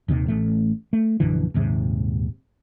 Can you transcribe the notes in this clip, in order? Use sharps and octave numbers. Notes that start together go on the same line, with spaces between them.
D#1 D#2 C3 D#3
A1 A3
A3
A#1 F#2 D3 E3
D#1 D#2 G#2 C3